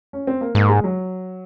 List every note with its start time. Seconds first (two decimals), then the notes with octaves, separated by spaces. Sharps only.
0.13 C#4
0.27 C4
0.41 A#3
0.55 G#2 A#3
0.69 G#3
0.84 F#3